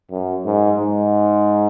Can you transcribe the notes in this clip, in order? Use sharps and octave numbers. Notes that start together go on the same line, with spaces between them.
F#2
G#2
G#2